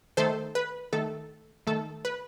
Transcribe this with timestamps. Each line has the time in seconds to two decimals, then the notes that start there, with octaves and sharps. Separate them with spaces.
0.17 D#3 A3 A4 C5
0.55 B4
0.93 D#3 A3 A4
1.67 D#3 A3 A4
2.05 B4